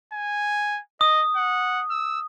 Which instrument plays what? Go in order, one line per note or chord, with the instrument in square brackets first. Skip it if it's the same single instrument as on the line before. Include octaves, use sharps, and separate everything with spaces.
[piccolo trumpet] G#5
[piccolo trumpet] D#5 [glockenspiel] D#6
[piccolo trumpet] F#5
E6